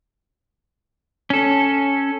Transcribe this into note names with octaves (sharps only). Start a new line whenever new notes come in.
C#4 A4